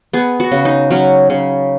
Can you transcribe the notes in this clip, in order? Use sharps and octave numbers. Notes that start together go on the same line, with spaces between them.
B3 G#4
F#4
C#3
D#4
F#3 C#4
C#3